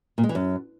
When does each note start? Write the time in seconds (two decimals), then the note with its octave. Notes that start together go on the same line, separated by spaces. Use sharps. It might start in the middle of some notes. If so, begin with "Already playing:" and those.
0.18 A#2
0.24 G#3
0.29 E3
0.35 F#2